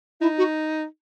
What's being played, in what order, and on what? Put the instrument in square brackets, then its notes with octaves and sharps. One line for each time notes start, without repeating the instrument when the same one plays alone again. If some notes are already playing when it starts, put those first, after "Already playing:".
[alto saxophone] D#4 [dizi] E4
[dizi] F#4